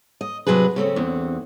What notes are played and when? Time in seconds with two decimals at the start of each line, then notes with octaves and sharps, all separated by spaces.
0.21 D#5
0.47 C3 F#3 D4 G#4 B4
0.76 C#3 A3 C4 C#4
0.96 E2 D3 C4